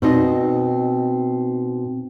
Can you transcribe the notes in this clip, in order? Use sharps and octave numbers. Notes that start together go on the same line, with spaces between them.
B2 C4 D#4 D#5